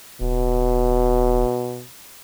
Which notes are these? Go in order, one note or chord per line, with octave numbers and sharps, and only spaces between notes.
D1 B2